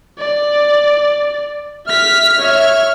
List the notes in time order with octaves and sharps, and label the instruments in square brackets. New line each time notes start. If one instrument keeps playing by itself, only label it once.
[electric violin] D5
[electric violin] E5 B6 [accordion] F6
[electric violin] C#5 E5